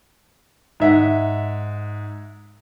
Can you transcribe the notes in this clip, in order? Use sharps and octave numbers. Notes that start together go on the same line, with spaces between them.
G#2 E5 F#5